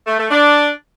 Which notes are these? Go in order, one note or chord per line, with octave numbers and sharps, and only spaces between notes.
A3
A3
D4